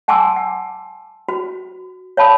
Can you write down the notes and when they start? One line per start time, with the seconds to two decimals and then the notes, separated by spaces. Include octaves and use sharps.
0.08 F#5 G#5 A5 C6 D6 E6
0.36 F#5
1.29 F#4
2.17 C#5 F5 A5 B5 D#6